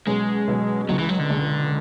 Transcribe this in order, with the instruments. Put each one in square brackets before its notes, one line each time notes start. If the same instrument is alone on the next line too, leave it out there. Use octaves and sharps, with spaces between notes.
[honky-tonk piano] B2 F#3 C#4 G#4 [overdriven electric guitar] G#3
[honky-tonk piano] B2 F#3 C#4 G#4
[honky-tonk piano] C#2 C#3 G#3 [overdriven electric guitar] F#3
[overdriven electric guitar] E3
F#3
D3
[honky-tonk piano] C#2 C#3 G#3